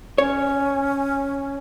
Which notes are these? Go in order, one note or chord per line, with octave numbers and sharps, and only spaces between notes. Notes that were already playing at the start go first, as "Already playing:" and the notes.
C#4 C#5